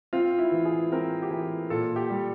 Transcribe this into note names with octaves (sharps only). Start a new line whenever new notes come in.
C4 F4
E4
E3
G#4
C4 A#4
G4
E3 G#4
A#2 A4
G4
G3